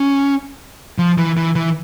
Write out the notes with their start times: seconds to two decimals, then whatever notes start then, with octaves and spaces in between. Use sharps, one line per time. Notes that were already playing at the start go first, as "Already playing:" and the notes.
Already playing: C#4
0.98 F3
1.18 E3
1.37 E3
1.55 E3